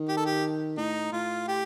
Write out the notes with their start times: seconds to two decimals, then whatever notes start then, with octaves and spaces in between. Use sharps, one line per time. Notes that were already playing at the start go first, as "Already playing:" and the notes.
Already playing: D#3
0.08 G4
0.17 A4
0.25 G4
0.78 A2 D#4
1.12 A2 F4
1.48 G4